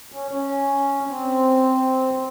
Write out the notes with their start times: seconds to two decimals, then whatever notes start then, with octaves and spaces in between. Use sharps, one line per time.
0.12 C#4
0.31 C#4
1.07 C4